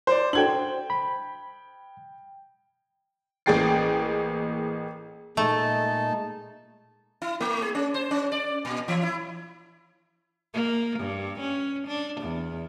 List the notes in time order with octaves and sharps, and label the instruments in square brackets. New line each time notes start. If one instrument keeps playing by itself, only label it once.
[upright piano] C5 D5
[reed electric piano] D4 F#4 A4 [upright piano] G5 G#6 F#7
[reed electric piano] C5
B5
[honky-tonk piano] A1 A#3 G#4 G5 A6 C7
[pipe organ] A#2 G#3 [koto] A3 [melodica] D#4 A5
[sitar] E4
A3
G#4
C#4
C5
C#4
D5
A#2
E3
E4
[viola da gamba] A#3
G2
C#4
D4
E2